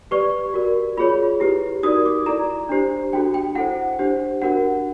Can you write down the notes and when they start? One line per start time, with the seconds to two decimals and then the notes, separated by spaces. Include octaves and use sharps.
0.11 G4 B4 D5 C#6
0.54 F#4 A#4 D5
0.97 F4 G#4 C#5 B5
1.40 E4 G4 B4
1.83 D#4 F#4 A#4 D5 D#6
2.06 D6
2.26 E4 A4 D5 A#5
2.69 D4 G4 C5
3.13 D4 F#4 A4 G5
3.34 G5
3.55 E4 A4 C5 F#5
3.99 D4 G4 C5
4.42 D4 F#4 A#4 F#5